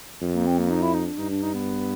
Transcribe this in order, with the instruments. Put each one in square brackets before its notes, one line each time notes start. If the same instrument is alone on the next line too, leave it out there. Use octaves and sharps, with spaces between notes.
[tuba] F2
[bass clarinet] A#3
C4
A#3
D#4
E4
D#4
D4
[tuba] G2 [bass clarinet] D#4
[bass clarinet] D4
D#4
B3